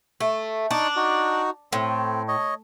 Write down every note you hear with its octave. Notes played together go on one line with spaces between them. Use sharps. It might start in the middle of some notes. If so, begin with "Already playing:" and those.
A3
D4 D#4 D5 C#6
D#4 F#4
A2 C4
C#5 D#5